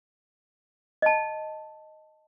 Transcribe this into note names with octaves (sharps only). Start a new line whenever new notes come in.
D#5 A5